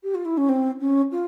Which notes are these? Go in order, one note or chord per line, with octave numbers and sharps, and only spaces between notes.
G4
F4
E4
C#4
C4
C#4
F4